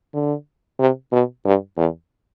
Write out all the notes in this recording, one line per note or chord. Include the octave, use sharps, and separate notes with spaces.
D3
C3
B2
G2
E2